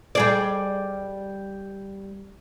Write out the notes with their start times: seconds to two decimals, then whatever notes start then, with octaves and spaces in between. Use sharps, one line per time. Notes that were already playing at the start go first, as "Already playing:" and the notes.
0.15 G3 G#4 D5